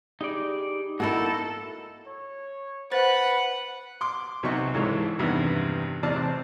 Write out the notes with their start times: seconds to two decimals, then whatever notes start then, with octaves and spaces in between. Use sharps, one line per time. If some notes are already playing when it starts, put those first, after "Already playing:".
0.21 G3 D#4 G#4 D5
1.00 A3 A#3 D#4 E4 F#4 A4 A#4
2.07 C#5
2.92 B4 C5 F#5 A6
4.01 C6 D6
4.43 B1 C3 F#3 D#4 C#6
4.74 C#2 G#2 E3 G#3 A4 C#5
5.19 E2 G2 C3 D#3 B3
6.03 E2 A2 C3 D5 A5 F6
6.15 C4 F#6